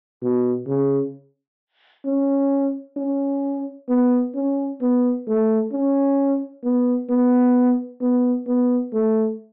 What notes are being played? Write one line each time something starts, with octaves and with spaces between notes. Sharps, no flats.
B2
C#3
C#4
C#4
B3
C#4
B3
A3
C#4
B3
B3
B3
B3
A3